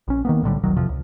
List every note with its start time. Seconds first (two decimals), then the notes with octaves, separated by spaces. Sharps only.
0.08 A#1 C#4
0.25 D#3 A#3 B3
0.42 B1 A2 D3 G3
0.63 D#1 B1 D#3 F#3
0.76 A1 F2 C3 F3
0.89 C#2